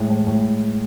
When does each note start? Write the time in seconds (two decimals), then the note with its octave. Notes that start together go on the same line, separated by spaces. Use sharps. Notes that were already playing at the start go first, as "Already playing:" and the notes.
Already playing: A2 G#3
0.10 A2
0.27 A2